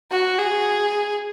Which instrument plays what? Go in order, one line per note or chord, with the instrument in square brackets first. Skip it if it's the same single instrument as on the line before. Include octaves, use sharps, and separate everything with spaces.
[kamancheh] F#4
G#4